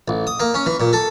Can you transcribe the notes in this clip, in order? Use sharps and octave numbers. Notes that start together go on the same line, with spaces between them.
A1
D#6
A#3
C#4
E3
A#2
A4